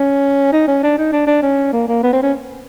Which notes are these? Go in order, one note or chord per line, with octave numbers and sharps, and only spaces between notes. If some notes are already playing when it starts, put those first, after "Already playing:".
Already playing: C#4
D#4
C#4
D4
D#4
D4
D4
C#4
A#3
A#3
B3
C4
C#4